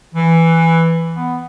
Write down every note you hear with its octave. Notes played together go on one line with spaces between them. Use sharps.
E3
B3